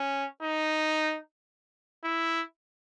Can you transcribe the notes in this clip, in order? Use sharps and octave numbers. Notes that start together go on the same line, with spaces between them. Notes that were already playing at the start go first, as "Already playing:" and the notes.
Already playing: C#4
D#4
E4